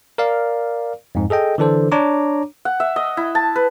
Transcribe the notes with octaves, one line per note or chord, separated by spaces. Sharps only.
A#4 D5 F5
F2 G#2
G#4 A4 D#5 G5
D3 E3 D4 A4 C5
D4 C#5 A#5 D6
F#5
E5
D#5
E4
A5
B4